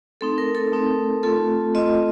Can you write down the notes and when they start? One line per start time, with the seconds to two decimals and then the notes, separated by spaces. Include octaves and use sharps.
0.21 A3 C4 D#4 A4
0.38 A#4
0.55 A4
0.72 A3 C4 D#4
1.23 A3 C4 F4 A4
1.74 A3 C4 F4 D#5